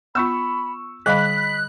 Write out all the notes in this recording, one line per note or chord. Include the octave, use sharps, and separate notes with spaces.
B3 F4 B5 C#6 E6
D3 G3 D#5 F5 B5 F#6 B6